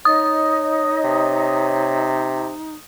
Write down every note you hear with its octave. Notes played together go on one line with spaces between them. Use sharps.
D#4 C#5 D#5 D#6
C3